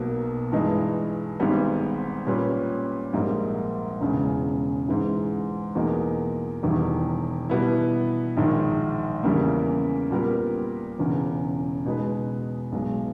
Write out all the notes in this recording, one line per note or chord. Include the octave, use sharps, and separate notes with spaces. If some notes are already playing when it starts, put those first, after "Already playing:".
Already playing: B1 B2 A#3
G2 E3 G#3 D#4
G#1 G#2 G3 B3
A#2 G3 C#4 G4 B4
A#1 G#2 G3 A#3 D#4
E1 E2 C#3 G#3
G#2 E3 G#3
E2 B2 A#3 D#4 G#4
E1 E2 D#3 G3
B2 G3 B3 E4
A#1 G#2 D#3
E2 C#3 E3 G3 A#3
A#2 G3 B3 G4 A#4
E1 E2 C#3
B2 G#3 D#4 G#4 B4
B1 B2 G#3